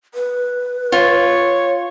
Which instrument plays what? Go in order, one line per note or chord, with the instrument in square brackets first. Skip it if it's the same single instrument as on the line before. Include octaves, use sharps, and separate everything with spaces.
[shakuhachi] B4
[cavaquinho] F4 [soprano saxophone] C#5